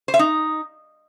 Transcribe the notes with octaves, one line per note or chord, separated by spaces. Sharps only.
C5
E5
D#4